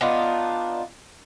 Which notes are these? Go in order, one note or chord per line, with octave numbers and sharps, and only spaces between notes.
B3 D4 D#4 F4